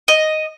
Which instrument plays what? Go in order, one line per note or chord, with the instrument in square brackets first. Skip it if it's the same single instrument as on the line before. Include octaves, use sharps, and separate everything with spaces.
[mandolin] D#5